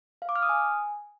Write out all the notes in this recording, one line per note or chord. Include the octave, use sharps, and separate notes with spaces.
F5
D6
F6
D#6
G#5